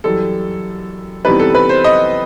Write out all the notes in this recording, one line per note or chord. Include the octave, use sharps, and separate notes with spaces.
F#2 E3 G3 A4
C3 E3 G3 B3 D#4 B4
A4
B4
C5
D#5